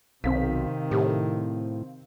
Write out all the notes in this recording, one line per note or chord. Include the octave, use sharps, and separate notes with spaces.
B1 C3 D#3 C4 F5 B6
A2 G4